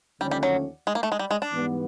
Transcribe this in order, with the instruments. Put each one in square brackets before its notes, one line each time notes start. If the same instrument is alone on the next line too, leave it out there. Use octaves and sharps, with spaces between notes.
[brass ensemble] D#2 D3 F3 A3 C#4 [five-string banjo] G3
[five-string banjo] G3
F#3
G#3
A#3
A3
G#3
G3
G#3
D4
[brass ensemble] G#2 E3 G3 B3